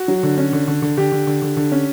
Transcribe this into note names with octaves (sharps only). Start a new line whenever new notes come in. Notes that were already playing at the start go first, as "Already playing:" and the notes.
Already playing: F#4
F#3
D3
C#4
D3
D3
D3
D3 G4
D3
D3
D3
D3
C#4